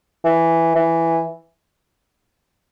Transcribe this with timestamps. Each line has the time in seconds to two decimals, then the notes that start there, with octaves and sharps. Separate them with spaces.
0.25 E3
0.75 E3